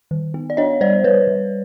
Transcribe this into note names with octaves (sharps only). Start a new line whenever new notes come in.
D#3
B3
D5
D4 C#5 D#5
G3 C5 D5
G3 B4 C#5
G3